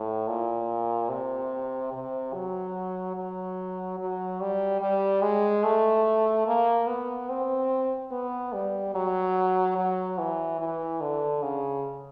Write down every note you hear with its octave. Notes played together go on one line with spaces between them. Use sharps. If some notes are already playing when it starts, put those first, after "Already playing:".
Already playing: A2
A#2
C3
C3
F#3
F#3
F#3
G3
G3
G#3
A3
A#3
B3
C4
B3
G3
F#3
F#3
E3
E3
D3
C#3